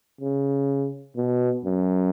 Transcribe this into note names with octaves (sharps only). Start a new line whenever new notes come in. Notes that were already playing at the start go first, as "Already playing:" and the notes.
C#3
B2
F#2